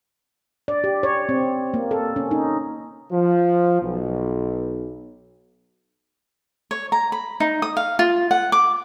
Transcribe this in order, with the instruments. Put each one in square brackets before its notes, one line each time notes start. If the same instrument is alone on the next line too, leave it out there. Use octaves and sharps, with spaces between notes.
[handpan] D5
G4
C#5
C4
A#3
A4
C#4
D#4
[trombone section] F3
B1
[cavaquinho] C#5
A#5
B5
D#4
D#6
F5
F4
F#5
D6